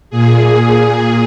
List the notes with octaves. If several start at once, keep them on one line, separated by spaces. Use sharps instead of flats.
A#2 G#4
A#2